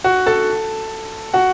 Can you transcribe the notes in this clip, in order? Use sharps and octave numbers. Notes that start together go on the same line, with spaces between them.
F#4 F#5
A4 A5
F#4 F#5